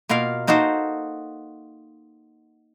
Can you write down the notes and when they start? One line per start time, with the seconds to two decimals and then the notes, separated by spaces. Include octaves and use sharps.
0.09 B2 A#3 F4 A#4 F5
0.47 A#3 D#4 F#4 A4 C5